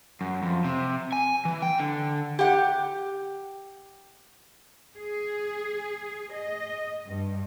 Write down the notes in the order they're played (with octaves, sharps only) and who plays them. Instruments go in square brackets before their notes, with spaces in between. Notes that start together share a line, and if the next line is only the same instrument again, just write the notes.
[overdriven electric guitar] F#2
F2
C3
G#5
E3
G5
D3
[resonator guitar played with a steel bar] G4 F#5
[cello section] G#4
D#5
G2